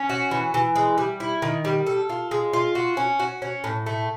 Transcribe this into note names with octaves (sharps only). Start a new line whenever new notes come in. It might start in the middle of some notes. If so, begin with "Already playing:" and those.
Already playing: C#4
F#4
E3
E3
G#3
G3
E4
D#3
G3
A4
F4
G#3
F4
F#4
C#4
F#4
C#4
A2
A3